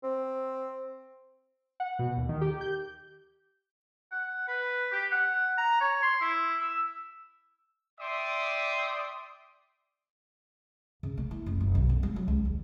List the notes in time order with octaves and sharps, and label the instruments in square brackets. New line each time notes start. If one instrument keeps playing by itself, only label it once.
[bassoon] C4
[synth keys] F#5
B2
D#2
D#3
G4
G6
[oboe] F#5
B4
G4
F#5
A#5
C#5
C6
E4
E6
[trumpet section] D5 E5 G5 C6 D6 D#6
[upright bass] C#3
A#3
E4
F1
F#1
B1
B3
G3
F#3
C#2
D#2